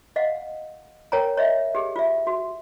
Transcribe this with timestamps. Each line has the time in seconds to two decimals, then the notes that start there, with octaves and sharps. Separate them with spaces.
0.16 D#5 F5 F#5
1.12 A#4 C#5 G5 G#5 A#5
1.37 C#5 D#5 E5
1.75 G4 G#4
1.96 F4 E5
2.27 F#4